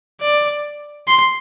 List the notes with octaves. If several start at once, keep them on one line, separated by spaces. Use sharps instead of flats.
D5
C6